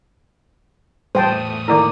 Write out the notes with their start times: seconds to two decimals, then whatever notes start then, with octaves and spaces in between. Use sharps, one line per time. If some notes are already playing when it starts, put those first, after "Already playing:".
1.15 E2 A2 G3 C5 G5 A5 D#6
1.68 D#3 A#3 E4 A4 D5 D6